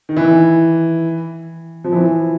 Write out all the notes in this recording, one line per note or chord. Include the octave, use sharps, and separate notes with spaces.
D#3
E3
F3
E3